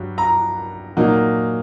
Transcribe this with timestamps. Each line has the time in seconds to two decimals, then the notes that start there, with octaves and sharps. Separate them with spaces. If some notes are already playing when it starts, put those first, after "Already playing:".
Already playing: G2 F#3
0.18 A#5
0.97 A#2 F#3 A#3 D#4